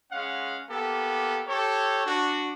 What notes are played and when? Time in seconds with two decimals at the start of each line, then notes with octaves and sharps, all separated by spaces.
0.11 G#3 C#4 F5 F#5
0.70 A#3 B3 G4 A4
1.47 G4 A4 C#5
2.05 D4 F#4